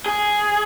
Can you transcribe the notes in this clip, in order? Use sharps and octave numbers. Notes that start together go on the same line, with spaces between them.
G#4